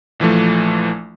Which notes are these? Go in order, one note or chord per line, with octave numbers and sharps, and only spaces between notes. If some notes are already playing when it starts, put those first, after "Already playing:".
A#1 E3 F3 A3